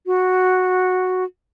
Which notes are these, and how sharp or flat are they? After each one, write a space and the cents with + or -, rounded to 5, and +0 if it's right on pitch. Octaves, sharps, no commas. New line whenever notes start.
F#4 -5